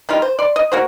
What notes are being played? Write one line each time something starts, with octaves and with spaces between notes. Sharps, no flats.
D#3 G3 F4
C5
D5 C6
D#5
A#3 F#4 C5